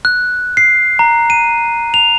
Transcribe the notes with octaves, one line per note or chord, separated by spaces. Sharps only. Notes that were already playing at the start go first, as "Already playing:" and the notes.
F#6
C7
A#5
D#7
F7